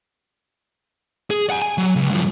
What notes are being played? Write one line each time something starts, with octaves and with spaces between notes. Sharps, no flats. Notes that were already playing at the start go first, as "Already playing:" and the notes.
G#4
F#5 G#5
G#5
F#3
C#2
G2 F3